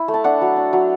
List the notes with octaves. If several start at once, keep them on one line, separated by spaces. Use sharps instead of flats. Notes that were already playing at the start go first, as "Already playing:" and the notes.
Already playing: E4 B5
A3
A5
D4 F#5
F#3
D4
F#3